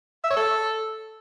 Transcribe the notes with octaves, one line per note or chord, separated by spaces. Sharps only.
E5
C#5
A4